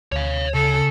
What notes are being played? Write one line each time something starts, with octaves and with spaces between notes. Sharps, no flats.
D2 C#5 F5
C#3 A4